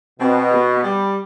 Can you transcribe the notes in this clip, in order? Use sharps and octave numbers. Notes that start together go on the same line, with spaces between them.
B2 C4
B3
G3